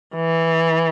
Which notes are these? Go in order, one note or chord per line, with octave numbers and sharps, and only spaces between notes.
E3